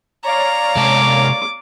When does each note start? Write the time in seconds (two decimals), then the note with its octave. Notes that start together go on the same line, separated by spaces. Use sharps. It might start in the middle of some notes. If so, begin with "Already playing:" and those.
0.24 C#5 D5 F5 A#5
0.76 C3 G#3 A5 D6